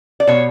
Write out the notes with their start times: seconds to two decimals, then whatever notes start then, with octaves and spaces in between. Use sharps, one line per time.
0.20 D5
0.27 B2 C#5